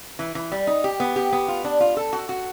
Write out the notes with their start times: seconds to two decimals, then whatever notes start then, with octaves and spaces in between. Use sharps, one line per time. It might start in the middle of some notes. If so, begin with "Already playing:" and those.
0.19 E3
0.35 E3
0.52 G3
0.67 D#4
0.84 G4
1.00 B3
1.16 G4
1.33 B3
1.48 F4
1.64 D4
1.81 F4
1.97 A4
2.13 F#4
2.29 F#4